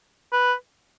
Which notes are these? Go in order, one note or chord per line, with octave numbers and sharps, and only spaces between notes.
B4